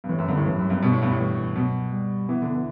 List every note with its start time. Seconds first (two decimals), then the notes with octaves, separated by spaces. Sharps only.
0.04 G2
0.09 A2 E3
0.19 F#2
0.28 G2 D3
0.37 A2
0.46 G2 E3
0.58 F#2 F#3
0.70 G2 F#3
0.83 B2 G3
0.92 A2
1.02 G2
1.11 A2
1.19 E3
1.38 E3
1.56 B2 F#3
1.92 G3
2.29 E3 B3
2.42 D3
2.55 E3